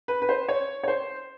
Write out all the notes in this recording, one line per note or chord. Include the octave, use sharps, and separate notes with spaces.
B4
B4
C5
C#5
C#5
C5